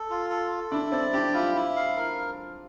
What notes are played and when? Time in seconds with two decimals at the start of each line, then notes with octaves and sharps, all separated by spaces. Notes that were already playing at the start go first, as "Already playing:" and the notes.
Already playing: A4
0.10 F4
0.30 A4
0.51 A4
0.71 D4 E4
0.92 C4 D5
1.13 D4 G4
1.34 E4 F4
1.55 E4
1.76 F5
1.96 A#4